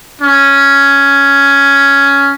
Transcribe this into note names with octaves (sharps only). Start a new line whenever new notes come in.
C#4